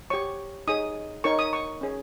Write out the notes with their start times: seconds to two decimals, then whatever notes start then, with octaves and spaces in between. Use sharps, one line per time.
0.10 G4 C#5 C#6
0.67 D#4 G#4 C#5 D#6
1.24 D#4 A#4 C#5 C#6
1.39 D#6
1.53 C#6
1.81 C#4 G#4 C#5